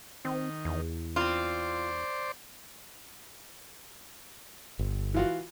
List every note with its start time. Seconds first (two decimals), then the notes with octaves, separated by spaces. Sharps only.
0.25 D#3 C4
0.65 E2
1.16 C4 F4 C5 D5
4.79 G1
5.14 E3 F4 F#4